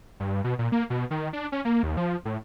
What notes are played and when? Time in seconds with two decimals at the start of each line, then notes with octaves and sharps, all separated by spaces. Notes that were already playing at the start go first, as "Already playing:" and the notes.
0.20 G2
0.44 B2
0.59 A#2
0.72 A#3
0.90 B2
1.11 D#3
1.33 D4
1.52 C#4
1.65 A#3
1.83 D#2
1.97 F3
2.25 A2